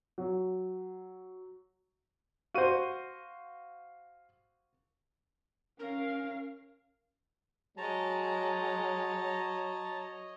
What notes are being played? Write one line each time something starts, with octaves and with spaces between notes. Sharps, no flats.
F#3
F#4 C5 F5 D#7
C#4 A#4 F5
F#3 G#3 C#5 D#5 A5 A#5